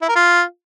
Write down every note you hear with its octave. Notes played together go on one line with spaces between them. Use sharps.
E4
A#4
F4